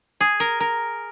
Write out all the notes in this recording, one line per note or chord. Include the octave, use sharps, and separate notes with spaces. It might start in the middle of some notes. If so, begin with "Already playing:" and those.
G#4
A#4
A#4